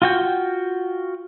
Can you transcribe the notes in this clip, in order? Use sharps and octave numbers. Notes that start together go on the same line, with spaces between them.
F4 F#4 G5